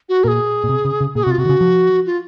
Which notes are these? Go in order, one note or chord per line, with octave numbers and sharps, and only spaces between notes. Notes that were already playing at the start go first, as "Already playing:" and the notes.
F#4
A#2 G#4 A#4
A#2
C3
C#3
C#3
A#2 G#4
F#4
C3
F4
C3 F#4
D#3
C#3
F3
F4